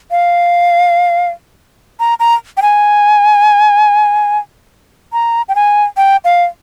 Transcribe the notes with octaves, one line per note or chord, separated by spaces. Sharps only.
F5
A#5
A#5
G5
G#5
A#5
G5
G#5
G5
F5